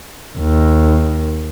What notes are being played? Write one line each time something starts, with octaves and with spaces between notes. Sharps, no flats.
D#2